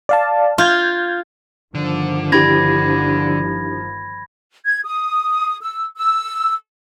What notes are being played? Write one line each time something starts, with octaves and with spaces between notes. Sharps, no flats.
D5 F5 A5
F4 F6 G6 G#6
G1 D3 D#3 F3
D4 E4 G4 B5 G#6 A#6
G#6
D#6
E6
E6